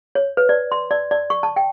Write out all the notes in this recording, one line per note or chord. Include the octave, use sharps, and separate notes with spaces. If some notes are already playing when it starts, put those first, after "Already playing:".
C#5
B4
D5
C6
D5
D5
C#6
A5
G5